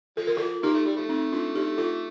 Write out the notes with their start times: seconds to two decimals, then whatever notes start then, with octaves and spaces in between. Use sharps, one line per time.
0.17 F3 A4
0.27 A#4
0.37 F4 A4
0.63 A#3 D#4 G4
0.74 A3
0.86 G3
0.96 F3 A3
1.09 C4 D#4
1.33 D4 F4
1.55 D#4 G4
1.78 F4 A4